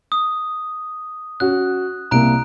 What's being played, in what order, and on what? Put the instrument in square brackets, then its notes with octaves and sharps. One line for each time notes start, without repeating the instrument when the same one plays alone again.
[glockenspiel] D#6
[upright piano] C#4 F#4 [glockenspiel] F#6
[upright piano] C2 A#3 [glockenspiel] A#5 F#6 D7